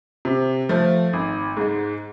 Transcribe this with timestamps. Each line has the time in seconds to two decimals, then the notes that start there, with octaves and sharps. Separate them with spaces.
0.25 C3
0.69 F3 A3
1.13 G#1
1.57 G#2 G#3